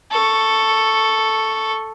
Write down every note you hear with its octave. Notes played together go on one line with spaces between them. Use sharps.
A4 C#6